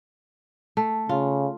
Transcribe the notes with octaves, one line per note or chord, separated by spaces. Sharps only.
A3
C#3 F4